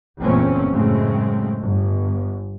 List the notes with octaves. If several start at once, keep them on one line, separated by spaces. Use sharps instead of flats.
F#1 E2 A#2 A3 C4 C#4
F#2 A2 C#3 G#3 A3 C4
G1